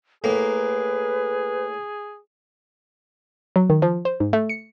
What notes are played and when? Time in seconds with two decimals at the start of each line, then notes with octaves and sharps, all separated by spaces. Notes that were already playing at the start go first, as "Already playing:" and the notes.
0.24 A2 A#3 G#4 B4 A#5
3.56 F#3
3.70 D#3
3.82 F3
4.05 C5
4.20 G#2
4.33 A3
4.49 C#7